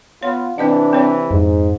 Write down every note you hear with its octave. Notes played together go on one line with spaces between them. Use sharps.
B3 F4 C#5
C3 E3 C4 D4 B4 D#5 F#5
C4 C#5
F2 G#2